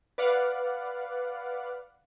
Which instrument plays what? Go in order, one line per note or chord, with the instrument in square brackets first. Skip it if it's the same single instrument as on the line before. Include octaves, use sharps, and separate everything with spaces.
[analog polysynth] B4 D5 F5 F#5